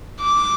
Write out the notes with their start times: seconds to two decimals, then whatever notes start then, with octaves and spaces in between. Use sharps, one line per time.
0.21 D6